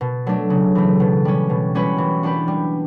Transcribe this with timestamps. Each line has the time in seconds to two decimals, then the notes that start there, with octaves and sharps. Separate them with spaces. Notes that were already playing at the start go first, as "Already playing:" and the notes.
0.01 B2
0.26 F#3 A3 D4
0.50 C#3
0.75 E3 A3
1.00 B2
1.25 G3 C#4
1.50 B2
1.75 G3 C#4 F#4 B4
1.98 E3
2.23 B3 D4 G4 B4
2.48 G3